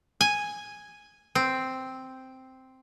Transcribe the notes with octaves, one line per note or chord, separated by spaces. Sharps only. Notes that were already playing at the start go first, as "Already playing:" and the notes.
G#5
C4